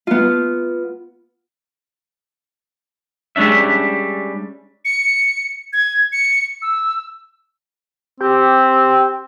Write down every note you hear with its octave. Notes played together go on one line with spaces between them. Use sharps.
B3 F4
G3 G#3 C#4 D4 E5
C#7
G#6
C#7
E6
C4 G4